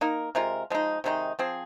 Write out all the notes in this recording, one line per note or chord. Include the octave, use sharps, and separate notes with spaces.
A#3 D#4 A#4
C3 G#3 F4 A#4
F3 G#3 D#4
C3 D#3 G#3 D#4
F3 C4 G#4